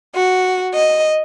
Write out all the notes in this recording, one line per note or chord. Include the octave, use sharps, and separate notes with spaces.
F#4
D#5